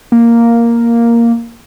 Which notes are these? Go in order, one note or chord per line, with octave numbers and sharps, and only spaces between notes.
A#3